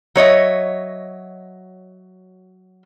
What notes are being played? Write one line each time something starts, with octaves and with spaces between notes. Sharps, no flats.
F#3 C#5 D#5 E5